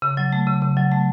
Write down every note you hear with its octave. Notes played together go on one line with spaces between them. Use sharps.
C#3
F#3
A3
C#3
C#3
F#3
A3